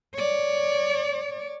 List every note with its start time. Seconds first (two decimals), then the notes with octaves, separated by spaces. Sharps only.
0.14 C#5 D5